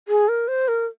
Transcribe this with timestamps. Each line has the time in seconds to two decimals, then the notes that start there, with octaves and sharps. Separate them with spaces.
0.08 G#4
0.28 A#4
0.48 C5
0.68 A#4